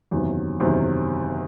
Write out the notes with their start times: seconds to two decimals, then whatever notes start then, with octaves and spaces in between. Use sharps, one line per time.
0.11 F#1 E2 C3 D#3 F#3
0.60 F#1 E2 C3 D#3 F#3